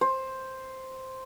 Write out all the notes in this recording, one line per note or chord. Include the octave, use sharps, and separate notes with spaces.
C5